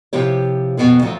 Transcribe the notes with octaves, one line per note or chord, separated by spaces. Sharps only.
C3 F3 E4 G4 C#5
F2 B2 B3 G#4
D2 F3 F#3